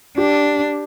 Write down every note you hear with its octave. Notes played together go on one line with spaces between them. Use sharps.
D4 G4